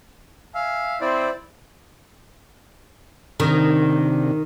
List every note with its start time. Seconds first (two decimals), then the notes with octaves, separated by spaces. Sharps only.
0.55 E5 F5 G#5
1.01 C4 E4 C5 D5
3.40 C3 D#3 D4